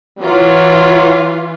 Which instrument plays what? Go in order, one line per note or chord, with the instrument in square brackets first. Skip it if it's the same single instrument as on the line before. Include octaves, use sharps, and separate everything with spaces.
[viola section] E3 F4 [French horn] F#3